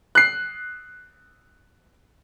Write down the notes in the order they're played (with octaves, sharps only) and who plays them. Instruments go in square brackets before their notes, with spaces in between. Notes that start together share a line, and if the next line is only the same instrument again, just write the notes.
[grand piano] F#6 C7